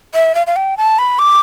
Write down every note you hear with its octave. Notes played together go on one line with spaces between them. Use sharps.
E5
F5
F5
G5
A5
B5
D6